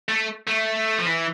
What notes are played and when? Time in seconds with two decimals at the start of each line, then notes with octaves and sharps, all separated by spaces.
0.09 A3
0.48 A3
0.98 F3
1.06 E3